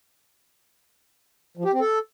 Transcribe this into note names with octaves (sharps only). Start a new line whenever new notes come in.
F3
G4
C4
A4